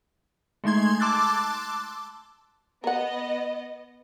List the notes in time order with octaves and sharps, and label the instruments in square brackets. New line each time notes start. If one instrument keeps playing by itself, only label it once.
[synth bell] G#3 A3 D#4 C6 G#6
A5 C6 D6 E6 F#6 A6
[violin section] B3 D#5 [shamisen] A#4 F#5